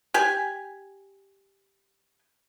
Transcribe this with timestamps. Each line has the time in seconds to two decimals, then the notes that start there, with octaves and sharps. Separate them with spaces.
0.14 G4 G#5